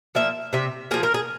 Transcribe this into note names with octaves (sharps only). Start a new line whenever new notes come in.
F3 A#3 E5
C3 E5
F3 A#3 G#4
A#4
G#4